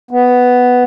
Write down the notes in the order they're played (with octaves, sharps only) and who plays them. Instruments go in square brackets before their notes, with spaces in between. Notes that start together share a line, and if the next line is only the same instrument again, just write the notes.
[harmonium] B3